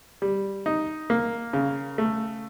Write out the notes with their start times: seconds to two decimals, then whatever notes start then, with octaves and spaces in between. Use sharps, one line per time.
0.22 G3
0.66 D#4
1.10 A#3
1.53 C#3
1.98 A3